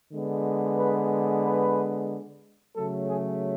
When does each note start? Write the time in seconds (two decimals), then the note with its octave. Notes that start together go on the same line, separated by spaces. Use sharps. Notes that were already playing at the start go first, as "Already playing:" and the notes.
0.12 D3 G#3 B3
0.77 B4
1.44 B4
2.76 C#3 F#3 A3 A4
3.08 G#4